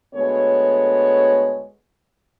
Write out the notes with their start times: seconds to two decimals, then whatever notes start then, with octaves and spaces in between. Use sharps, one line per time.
0.15 D2 G#3 B3 A4 C#5